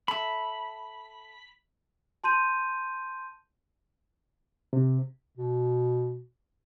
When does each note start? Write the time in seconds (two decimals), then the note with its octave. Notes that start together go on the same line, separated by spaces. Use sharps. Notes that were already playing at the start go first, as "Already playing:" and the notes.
0.08 A4 E5 B5
2.24 A5 C6 G6 D#7
4.73 C3
5.37 B2